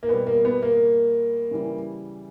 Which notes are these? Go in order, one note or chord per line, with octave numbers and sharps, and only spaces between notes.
A#3
B2 G3 B3
A#3
B3
A#3
C#3 E3 G3